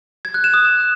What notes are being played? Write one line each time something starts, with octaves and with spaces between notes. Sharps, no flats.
G#6
F#6
E7
D#6